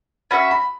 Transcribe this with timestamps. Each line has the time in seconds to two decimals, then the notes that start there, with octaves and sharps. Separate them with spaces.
0.31 C#4 F#4 E5 B5
0.51 B5